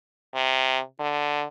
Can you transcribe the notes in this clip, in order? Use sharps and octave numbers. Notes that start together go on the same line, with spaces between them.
C3
D3